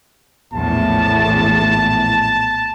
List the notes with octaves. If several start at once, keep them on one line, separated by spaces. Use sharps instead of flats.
A#1 E2 A2 A5